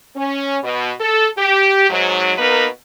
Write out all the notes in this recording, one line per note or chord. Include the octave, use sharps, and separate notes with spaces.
C#4
B2
A4
G4
G#2 F#3
B2 A#3 B3 D#4 A#4 B4